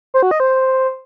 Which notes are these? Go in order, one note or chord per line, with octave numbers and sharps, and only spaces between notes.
C5
F#4
D#5
C5